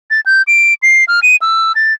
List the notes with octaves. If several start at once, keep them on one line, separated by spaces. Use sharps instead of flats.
A6
G6
D7
C7
F6
D#7
E6
A6